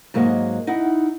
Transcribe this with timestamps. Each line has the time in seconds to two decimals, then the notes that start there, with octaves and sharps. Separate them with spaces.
0.14 G#2 F#3 A#3 G#4 D#5
0.67 D#4 E4 F#5